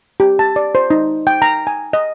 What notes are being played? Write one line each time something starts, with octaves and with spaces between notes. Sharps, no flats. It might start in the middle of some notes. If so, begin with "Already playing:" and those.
G4
A5
D5
C5
D#4
G5
A#5
G#5
D#5